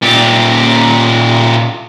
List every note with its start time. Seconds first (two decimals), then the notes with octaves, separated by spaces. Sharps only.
0.02 A#2 G4